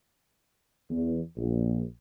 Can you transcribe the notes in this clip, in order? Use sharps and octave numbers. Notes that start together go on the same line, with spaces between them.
E2
A#1